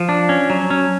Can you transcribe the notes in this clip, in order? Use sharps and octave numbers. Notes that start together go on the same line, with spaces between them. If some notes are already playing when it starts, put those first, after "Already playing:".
Already playing: F3
D4
C#4
F#3
C#4